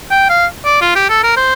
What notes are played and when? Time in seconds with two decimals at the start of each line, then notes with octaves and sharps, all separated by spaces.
0.11 G5
0.29 F5
0.64 D5
0.81 F4
0.95 G4
1.09 A4
1.23 A#4
1.37 C5